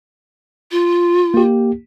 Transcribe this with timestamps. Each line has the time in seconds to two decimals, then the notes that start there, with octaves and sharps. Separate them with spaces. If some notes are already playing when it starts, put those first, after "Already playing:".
0.71 F4
1.34 A#3 G4